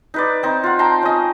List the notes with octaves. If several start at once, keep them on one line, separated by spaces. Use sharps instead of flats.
D#4 B4 D5
C4 D#4
F4 F#5
G5 A5 A#5 C6
C#4 D#5